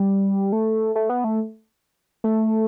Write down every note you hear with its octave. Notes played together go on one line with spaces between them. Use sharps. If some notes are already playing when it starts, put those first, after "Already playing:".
Already playing: G3
A3
A3
B3
A3
A3